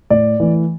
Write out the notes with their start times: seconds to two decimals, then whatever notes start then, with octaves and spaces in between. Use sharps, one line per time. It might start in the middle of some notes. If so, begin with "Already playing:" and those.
0.10 A2 D5
0.40 E3 A3